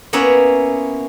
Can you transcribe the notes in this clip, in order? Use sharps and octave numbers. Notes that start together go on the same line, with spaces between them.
A#3 B3 C#4 E4 C#5 F#5